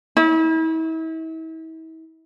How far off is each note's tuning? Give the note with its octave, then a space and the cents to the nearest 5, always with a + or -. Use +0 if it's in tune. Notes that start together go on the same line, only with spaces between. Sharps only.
E4 -40